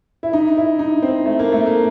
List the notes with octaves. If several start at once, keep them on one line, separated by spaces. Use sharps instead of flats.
E4
D#4
E4
D#4
C4
A3
A#3
A3
A#3